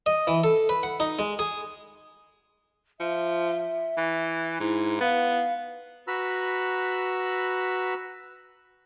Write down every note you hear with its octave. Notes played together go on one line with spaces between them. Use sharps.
D#5
E3
A4
B4
F#5
D#4
G#3
G#4
F3 E5
E3
G#2 E4
B3 F5
F#4 B4 A#5 B5 E6